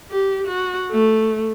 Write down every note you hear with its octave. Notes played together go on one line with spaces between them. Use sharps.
G4
F#4
A3